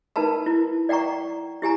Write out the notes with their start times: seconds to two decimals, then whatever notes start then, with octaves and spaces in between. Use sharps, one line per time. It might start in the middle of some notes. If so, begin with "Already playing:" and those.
0.16 D#4 A#4 B4 A5 B5
0.46 E4
0.89 D5 F#5 G5 A#5 C#6
1.62 E4 G4 G#5 A#5